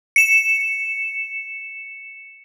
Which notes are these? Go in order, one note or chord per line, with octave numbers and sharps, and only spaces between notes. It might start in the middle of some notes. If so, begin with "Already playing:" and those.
C#7 E7